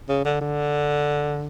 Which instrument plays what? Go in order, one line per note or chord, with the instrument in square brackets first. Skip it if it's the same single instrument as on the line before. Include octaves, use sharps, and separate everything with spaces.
[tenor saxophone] C#3
D3
D3